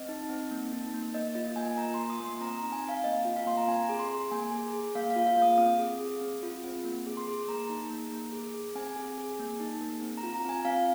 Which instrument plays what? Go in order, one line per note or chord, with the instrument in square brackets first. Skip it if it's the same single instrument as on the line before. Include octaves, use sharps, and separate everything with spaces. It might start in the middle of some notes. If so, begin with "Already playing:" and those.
Already playing: [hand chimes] C4 D#5
D#4
C4
A#3
D#4
A#3
A#3 D#5
F4 D#5
A#3 G#5
A#3 A#5
F4 C6
D#6
A#3 C6
C4 A#5
D#4 A#5
G#5
C4 F5
A#3 D#5
F4
F5
A#3 C6
A#5
C4 G#5
A#5
G#4
C6
G#4
C6
A#3 G#5
G#4
G#4
A#3 F5
F5
F4
F5
A#3
D#6
C4 D#6
G#4
G#4
C4
F4
C4
A#3
G#4
C6
G#4
A#3 A#5
D#4
A#3
A#3
G#4
G#4
C4 G#5
G#4
G#4
A#3
D#4
A#3
C4
A#5
F4
A#5
C4 G#5
C4 F5